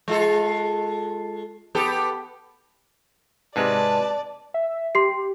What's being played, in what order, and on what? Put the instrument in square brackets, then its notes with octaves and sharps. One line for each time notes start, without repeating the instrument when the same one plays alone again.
[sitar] G#3 F4 A4
B3 G4 A4
[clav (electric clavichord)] G#2 C3 G#3 [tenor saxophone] B4 [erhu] D5 [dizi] A5
[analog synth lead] E5
[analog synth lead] G4 [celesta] C6 C7